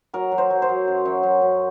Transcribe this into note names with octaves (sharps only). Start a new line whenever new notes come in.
F#3 A#4
F#3
C5
F#3
C5
F#3
F#2
F#2
F#2
F#2